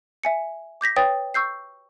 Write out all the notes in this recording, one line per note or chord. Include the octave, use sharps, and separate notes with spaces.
E5 G#5 C#7
D6 G6 A#6 B6
B4 C#5 G5 D#6 A6
C#6 E6 G6 C7